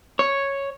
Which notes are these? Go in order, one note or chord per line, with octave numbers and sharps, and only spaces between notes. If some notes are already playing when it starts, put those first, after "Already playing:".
C#5